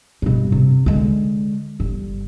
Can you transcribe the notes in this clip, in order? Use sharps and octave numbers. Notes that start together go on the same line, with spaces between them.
G2 B2
C3
D3 G#3
G1